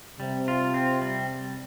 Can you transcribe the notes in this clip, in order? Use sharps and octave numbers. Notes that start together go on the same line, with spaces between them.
C3 G3
F4
C4
G3